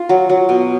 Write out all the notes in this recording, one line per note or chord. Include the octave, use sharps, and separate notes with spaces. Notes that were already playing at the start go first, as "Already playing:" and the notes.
Already playing: F4
F#3
F#3
B2